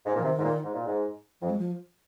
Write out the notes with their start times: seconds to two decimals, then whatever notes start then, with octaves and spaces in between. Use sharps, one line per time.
0.06 G#2
0.15 A#2 F3
0.23 C3 D#3
0.38 G#2
0.43 A#2
0.63 G#2
0.74 A#2
0.86 G#2
1.41 F2 F3
1.50 G#3
1.59 F3